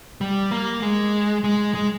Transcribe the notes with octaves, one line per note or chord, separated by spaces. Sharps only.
G3
A#3
G#3
G#3
G#3